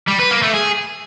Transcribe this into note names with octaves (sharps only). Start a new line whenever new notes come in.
G3
B4
A#3
A3
G#4